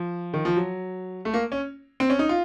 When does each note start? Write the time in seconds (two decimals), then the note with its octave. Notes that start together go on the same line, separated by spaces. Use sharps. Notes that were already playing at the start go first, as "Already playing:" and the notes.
Already playing: F3
0.34 D#3
0.45 F3
0.56 F#3
1.25 A3
1.34 A#3
1.52 C#4
2.00 C4
2.10 C#4
2.19 D#4
2.29 F4